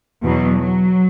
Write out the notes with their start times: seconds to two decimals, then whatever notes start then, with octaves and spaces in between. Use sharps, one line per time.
0.25 E2 B2 F#3
0.61 F#3